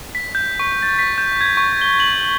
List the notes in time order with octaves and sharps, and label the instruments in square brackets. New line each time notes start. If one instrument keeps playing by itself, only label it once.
[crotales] B6
G6
C#6
A6
B6
G6
G#6
C#6
G7
F#7